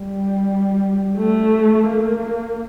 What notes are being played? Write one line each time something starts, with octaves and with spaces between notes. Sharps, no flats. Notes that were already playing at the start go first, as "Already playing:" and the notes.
Already playing: G3
A3
A#3